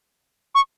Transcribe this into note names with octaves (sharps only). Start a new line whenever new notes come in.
C#6